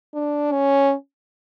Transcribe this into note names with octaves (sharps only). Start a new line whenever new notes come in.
D4
C#4